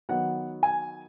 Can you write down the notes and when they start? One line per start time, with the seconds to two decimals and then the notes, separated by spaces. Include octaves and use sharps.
0.09 D#3 F#3 B3 F#5
0.63 G#5